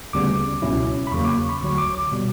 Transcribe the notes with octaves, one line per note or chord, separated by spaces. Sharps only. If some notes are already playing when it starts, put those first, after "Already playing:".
D2 C#3 G3 B3 D6
C#2 B2 F#3 C#4 E4
B5
E2 C#3 F#3 A#3 C#6
D6
C#6
B5
D2 D3 F#3 C#6
D6
D6
B2 G3